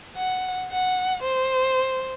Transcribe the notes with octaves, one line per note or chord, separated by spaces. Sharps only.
F#5
F#5
C5